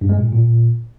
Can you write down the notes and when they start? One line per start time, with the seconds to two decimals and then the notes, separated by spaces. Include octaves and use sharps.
0.01 G2
0.09 G#3
0.17 A#2
0.25 A2
0.33 A#2